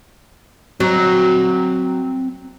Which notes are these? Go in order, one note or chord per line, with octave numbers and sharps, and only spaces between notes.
F#3 C4 A#5